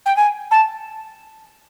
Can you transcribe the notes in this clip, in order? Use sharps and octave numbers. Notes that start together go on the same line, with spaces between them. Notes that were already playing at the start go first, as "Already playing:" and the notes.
G5
G#5
A5